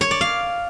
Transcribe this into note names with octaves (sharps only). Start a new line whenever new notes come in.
C#5
D5
F5